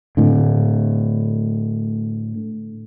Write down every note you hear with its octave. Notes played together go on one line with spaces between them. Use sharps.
A2 D3